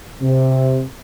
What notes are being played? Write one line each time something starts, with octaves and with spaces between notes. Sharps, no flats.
C3